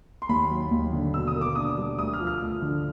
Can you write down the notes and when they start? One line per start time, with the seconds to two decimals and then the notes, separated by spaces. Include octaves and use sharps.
0.22 C6
0.29 D#2 B5
0.50 F#3
0.71 D#2
0.93 D3
1.14 B2 E6
1.28 D#6
1.35 A#3
1.41 D6
1.55 D4 D#6
1.78 G3
1.99 D2 D#6
2.13 F6
2.20 F3
2.27 F6
2.42 D2
2.62 D3